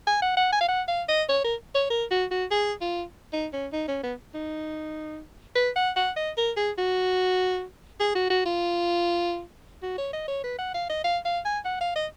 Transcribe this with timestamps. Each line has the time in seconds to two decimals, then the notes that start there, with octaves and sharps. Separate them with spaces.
0.07 G#5
0.22 F#5
0.37 F#5
0.52 G#5
0.61 F5
0.68 F#5
0.88 F5
1.08 D#5
1.29 C#5
1.44 A#4
1.74 C#5
1.90 A#4
2.11 F#4
2.31 F#4
2.51 G#4
2.81 F4
3.33 D#4
3.53 C#4
3.73 D#4
3.88 C#4
4.03 B3
4.34 D#4
5.55 B4
5.76 F#5
5.96 F#5
6.16 D#5
6.37 A#4
6.57 G#4
6.78 F#4
8.00 G#4
8.15 F#4
8.30 F#4
8.46 F4
9.83 F#4
9.98 C#5
10.13 D#5
10.28 C#5
10.44 B4
10.58 F#5
10.74 F5
10.89 D#5
11.04 F5
11.25 F5
11.45 G#5
11.65 F#5
11.81 F5
11.96 D#5